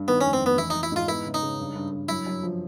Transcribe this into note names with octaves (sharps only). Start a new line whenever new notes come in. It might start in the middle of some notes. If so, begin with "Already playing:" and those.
Already playing: G2
D#3 B3
F1 C#4
C4
F1 B3
E3 E4
D#4
E3
E4
G#2 F4
B3 E4
C#3
D#4
C#3
G2
G2
G2
F#2 E4
F#2
F3